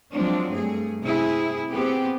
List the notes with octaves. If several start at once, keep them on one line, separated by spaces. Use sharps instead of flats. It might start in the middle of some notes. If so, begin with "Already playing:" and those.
F3 F#3 G#3 C4 D4
G2 A3 G#4
C3 E4 G#4
B3 C4 G4 G#4